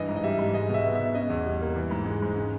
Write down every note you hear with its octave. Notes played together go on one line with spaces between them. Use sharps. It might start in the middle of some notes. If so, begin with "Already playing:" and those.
Already playing: G2 E3 D#5
G#2
D#5
G3 E5
G#2
G#3 D#5
B2
E5
B3
B2 E5
C#3 D#5
E2
G3
A#3
E3
G#2
G#3
G#2
C#3